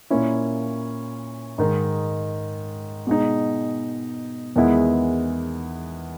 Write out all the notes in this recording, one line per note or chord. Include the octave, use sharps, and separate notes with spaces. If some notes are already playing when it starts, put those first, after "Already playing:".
A#2 A#3 C#4 E4
G#2 D#3 G#3 D#4
B2 G#3 D#4
E2 D#3 G#3 B3 E4